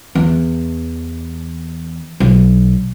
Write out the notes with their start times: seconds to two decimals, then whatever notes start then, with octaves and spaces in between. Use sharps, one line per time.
0.15 E2
2.20 B1